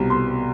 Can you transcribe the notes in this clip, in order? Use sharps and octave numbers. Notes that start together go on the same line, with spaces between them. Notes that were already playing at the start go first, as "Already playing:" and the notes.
Already playing: C2 B2
C6